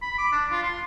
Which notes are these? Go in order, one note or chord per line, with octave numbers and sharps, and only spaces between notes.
B5
D6
D4
F4
C6